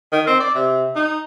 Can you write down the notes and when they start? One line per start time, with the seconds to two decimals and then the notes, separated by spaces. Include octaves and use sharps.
0.13 D#3
0.27 C4
0.40 D5
0.55 C3
0.96 D#4